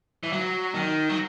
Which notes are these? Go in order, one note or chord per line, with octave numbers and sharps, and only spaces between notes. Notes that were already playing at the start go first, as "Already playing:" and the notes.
E3
F#3
D#3
F#3